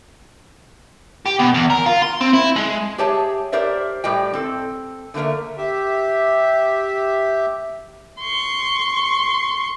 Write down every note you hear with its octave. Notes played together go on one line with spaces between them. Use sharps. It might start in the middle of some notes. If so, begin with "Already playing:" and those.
G4
B2
E2
A#4
F4
C6
C4
E4
G#3
G4 G#4 C#5 E5 A5
G4 A#4 C5 D5 E5
A2 G3 G4 D5 D#5 G5
C4 A4
D3 A3 A#3 A#4 E5
G4 E5
C6 C#6